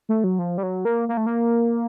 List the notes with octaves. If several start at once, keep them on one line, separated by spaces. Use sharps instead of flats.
A3
F#3
F3
G3
F#3
A#3
A#3
A3
A#3